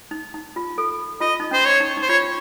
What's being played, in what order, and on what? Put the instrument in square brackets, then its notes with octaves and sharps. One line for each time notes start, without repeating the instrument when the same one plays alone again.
[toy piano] D#4
D#4
F4
A4
[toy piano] F4 [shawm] D#5
[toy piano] D#4
[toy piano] C#4 [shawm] C5
[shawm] C#5
[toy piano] D#4
D#4
[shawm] C5
[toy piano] F4 [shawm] C#5